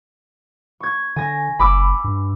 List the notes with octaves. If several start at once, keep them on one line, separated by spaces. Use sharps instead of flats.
C#6 G#6
D3 G#5 A#6
F#1 B5 D6 E6
G2